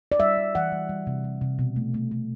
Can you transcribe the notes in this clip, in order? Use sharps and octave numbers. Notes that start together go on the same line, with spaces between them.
D5
G3 E5
G3
E3 F#5
G3
G3
C3
G3
C3
B2
A3
A3
A3